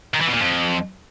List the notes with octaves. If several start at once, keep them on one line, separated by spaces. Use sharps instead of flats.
D#3
E3
B2
A#2
F2